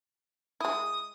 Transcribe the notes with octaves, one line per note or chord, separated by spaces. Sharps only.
G#3 E4 D#6